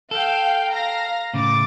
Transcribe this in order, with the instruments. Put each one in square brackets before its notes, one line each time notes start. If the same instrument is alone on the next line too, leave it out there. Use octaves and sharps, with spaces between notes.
[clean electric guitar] A4 [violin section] F5 G5
[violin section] F5 A#5 A#6
[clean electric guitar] A2 C#3 [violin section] D6 A6